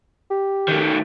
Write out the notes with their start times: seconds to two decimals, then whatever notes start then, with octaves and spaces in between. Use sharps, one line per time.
0.31 G4
0.68 D#3 A3